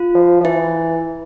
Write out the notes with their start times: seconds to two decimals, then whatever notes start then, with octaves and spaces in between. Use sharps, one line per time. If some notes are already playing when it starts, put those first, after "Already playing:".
Already playing: F4
0.15 F3
0.41 F3
0.45 E3 E4